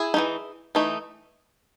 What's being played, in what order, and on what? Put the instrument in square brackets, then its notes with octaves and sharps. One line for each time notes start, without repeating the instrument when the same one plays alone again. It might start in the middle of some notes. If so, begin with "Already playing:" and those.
Already playing: [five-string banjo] E4 G#4
E3 A3 D#4
E3 A3 D#4